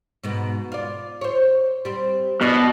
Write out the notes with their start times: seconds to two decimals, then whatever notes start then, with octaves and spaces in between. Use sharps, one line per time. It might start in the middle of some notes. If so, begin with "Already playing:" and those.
0.24 G#2 B2 B3
0.72 F4 D5
1.21 C5 C#5
1.85 G3 C4
2.41 B2 D4 E4 D5